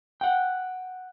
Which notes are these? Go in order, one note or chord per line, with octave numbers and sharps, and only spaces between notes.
F#5 G5